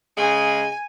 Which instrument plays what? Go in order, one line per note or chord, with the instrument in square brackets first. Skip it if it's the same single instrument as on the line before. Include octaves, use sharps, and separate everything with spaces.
[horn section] C#3 G#3 [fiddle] G#5